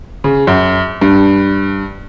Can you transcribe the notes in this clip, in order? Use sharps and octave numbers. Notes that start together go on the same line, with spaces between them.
C#3
F#2
G2